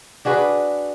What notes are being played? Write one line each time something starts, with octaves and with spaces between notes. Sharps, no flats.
D4 F#4 G#4 B4